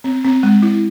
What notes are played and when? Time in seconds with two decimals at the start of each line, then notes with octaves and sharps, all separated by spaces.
0.04 C4
0.24 C4
0.43 G#3
0.62 E4